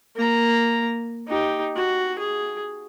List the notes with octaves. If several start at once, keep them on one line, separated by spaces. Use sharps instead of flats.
A#3 A#5
D#4 G4
F#4
G#4